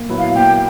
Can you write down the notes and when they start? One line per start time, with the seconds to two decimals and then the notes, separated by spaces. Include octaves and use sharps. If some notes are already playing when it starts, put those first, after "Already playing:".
Already playing: A#2
0.09 F#3 B3 E4
0.18 F5
0.35 A#2 G5